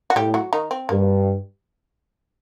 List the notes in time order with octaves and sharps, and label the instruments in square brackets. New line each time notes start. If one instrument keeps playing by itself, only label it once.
[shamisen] F#4
[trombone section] A2 [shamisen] G3 G4
[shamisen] F#3 F#4
D#3 D#4
C4
[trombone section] G2 [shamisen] A#3